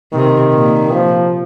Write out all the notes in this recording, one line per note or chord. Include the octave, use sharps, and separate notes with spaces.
C3 D#3
A#2
F3